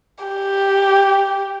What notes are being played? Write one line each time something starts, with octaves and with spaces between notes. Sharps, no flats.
G4